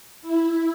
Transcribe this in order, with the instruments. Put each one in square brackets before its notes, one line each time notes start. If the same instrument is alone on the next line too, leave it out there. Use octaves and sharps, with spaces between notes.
[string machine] E4